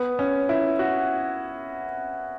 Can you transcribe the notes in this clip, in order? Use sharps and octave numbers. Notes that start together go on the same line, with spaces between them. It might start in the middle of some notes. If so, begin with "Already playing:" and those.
Already playing: B3
C#4
E4
F#4